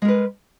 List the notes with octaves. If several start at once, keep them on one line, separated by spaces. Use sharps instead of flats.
G#3 A#4 B4